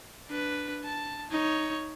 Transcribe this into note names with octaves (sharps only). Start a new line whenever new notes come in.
D4 B4
A5
D#4 C#5